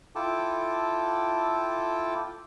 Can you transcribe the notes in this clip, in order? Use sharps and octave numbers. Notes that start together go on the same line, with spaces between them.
E4 F4 A4 G5 A5 D6